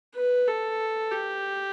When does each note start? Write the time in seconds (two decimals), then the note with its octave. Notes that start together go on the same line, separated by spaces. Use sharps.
0.15 B4
0.47 A4
1.12 G4